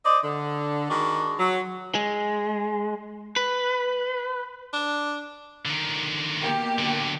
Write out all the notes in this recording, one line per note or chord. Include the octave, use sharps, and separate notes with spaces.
C5 D5 D#5
D3
D#3 G#3 D4 F#4
F#3
G#3
B4
D4
D3 D#3
B2 A#3 G4
D3 F#3